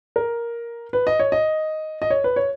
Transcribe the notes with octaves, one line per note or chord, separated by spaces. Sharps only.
A#4
B4
D#5
C#5
D#5
D#5
C#5
B4
C#5